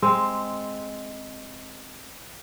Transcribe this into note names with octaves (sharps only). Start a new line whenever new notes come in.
G#3 C4